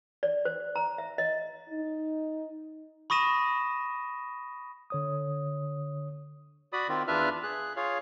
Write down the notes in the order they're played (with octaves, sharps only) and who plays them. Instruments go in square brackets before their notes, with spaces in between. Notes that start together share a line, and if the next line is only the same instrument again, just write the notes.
[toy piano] D5
C5
A#5
E5
D#5
[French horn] D#4
[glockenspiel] B5 C#6 D#6 A#6 D#7 E7
[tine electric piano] D3 C#5 D#6
[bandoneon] F#4 D5 B5 D#6
D#3 C4 F4
E2 D4 F4 B4 E5 F6
G#4 F#6
F4 G#4 C#5 F5